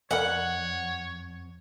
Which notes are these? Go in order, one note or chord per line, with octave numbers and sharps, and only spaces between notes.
F2 A#4 B4 C#5 D#5 F#5